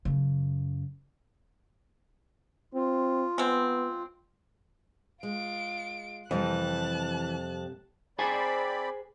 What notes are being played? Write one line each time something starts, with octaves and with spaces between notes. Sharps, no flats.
F#2 C#3
C4 F4
G#3 B3 C4
G#3 F4 D7
F2 C3 E3 G3 A#3 A5 F#6
C4 G#4 C5 D5 G#5 B5